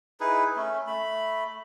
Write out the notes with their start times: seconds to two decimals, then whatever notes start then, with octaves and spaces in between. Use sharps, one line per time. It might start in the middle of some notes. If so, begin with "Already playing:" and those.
0.20 D#4 E4 G#4 B4
0.56 A3 C#4
0.87 A3 B5